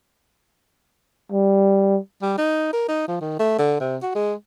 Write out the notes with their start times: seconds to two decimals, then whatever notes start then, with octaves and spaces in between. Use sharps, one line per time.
1.32 G3
2.22 G3
2.38 D#4
2.73 A#4
2.88 D#4
3.08 F3
3.21 D#3
3.39 A3
3.59 D3
3.80 C3
4.02 F#4
4.15 G#3